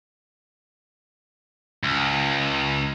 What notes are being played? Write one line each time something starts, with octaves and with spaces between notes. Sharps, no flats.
C#2